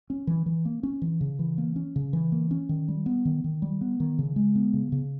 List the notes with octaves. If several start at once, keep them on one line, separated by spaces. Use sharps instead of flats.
C#4
E3
E3
A#3
C#4
E3
C#3
E3
A#3
C#4
C#3
E3
A#3
C#4
D#3
G3
B3
D#3
D#3
G3
B3
D#3
C#3
G#3
B3
C#3
C#3